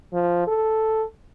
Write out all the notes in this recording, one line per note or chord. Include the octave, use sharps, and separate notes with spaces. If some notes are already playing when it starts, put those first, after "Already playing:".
F3
A4